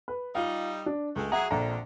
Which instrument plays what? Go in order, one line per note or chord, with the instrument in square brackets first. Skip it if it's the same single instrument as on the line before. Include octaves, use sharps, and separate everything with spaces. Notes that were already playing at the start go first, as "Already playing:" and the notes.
[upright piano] B4
[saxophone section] G3 D#4 [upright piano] F4 F5
[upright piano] D4
[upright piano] C#2 [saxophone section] G#3 A3
[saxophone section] F#3 F#4 G#4 [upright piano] E5 F#5 A#5
[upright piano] A#1 A#5 [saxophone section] F2 D3